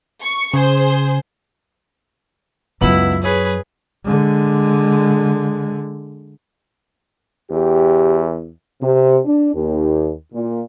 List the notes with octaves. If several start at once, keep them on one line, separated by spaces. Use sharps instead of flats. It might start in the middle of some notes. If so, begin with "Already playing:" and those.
C#6
C#3 G#4 C5
C#2 F#2 F#3 B3 E4 F#7
G#4 B4 C#5
D3 G#3
E2 G4
C3
D4
D#2
A#2